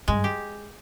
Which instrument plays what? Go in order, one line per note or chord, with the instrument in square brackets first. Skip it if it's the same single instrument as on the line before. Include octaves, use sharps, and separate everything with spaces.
[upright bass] G2 [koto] G#3
[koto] G4